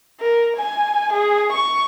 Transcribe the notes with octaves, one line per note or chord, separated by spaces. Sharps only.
A#4
G#5
G#4
C#6